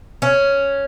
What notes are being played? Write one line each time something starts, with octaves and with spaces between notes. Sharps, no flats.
C#4